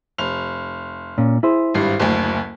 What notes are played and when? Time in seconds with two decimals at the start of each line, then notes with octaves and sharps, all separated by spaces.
0.18 F1 F7
1.18 A#2 C#4
1.43 E4 G#4 C5
1.74 G#1 G2 C7
2.00 F#1 D2